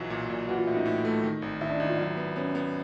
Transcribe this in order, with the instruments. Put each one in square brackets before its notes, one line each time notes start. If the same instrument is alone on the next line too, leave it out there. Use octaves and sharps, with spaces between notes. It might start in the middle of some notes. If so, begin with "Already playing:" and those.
Already playing: [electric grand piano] B1 E3 F#3 [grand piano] F4
[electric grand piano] A#2
A#2
[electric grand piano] E3 [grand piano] F#4
[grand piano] F4
[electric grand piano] A2 [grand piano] E4
[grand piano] D#4
[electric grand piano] A2
A3
D#3
G#1
[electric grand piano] G#1 [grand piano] E4
[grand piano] D4
[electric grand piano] G#1 [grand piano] D#4
[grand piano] F4
[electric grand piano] F#3 [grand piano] E4
[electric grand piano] B3
[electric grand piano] B3 [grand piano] C#4
[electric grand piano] B3